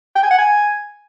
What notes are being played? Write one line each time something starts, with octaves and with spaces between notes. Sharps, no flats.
G5
G#5
F#5
G#5